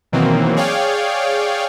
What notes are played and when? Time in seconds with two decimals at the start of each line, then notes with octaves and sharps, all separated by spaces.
0.13 B2 D#3 E3 F#3 A#3 C4
0.57 G#4 C#5 D5 F5 G5